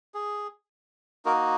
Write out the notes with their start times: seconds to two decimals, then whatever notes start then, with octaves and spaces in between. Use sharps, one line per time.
0.14 G#4
1.25 A#3 D#4 F#4 A#4